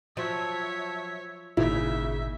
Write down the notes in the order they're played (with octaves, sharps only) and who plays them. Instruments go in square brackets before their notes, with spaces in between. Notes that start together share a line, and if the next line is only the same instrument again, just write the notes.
[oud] F3 F#3 [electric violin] C#5 E5
[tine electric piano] G#1 A#2 [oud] C#3 [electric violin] D#4 E5 [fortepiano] E4